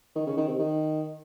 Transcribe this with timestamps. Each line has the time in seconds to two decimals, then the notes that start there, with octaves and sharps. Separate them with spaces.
0.15 D#3
0.26 C#3
0.37 D#3
0.48 C3
0.59 D#3